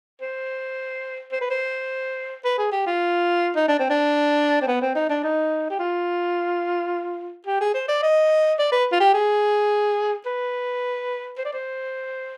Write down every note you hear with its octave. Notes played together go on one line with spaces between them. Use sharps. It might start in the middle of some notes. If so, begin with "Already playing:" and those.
C5
C5
B4
C5
B4
G#4
G4
F4
D#4
D4
C4
D4
C4
B3
C4
D#4
D4
D#4
G4
F4
G4
G#4
C5
D5
D#5
D5
B4
F4
G4
G#4
B4
C5
D5
C5